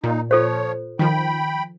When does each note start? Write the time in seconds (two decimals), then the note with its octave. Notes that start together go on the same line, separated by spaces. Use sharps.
0.04 A#2 D#4
0.31 F3 F4 A4 C5 C#5
0.99 D#3 F3 G5 B5